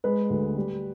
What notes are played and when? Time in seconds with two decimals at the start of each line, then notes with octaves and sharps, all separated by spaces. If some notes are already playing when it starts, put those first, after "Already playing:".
0.04 G#3 B4
0.30 D2
0.57 G3